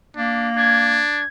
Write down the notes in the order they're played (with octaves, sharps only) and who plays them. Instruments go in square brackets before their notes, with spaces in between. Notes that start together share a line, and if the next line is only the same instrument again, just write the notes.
[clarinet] A#3 [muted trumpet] D4
[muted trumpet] D4 [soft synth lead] G#6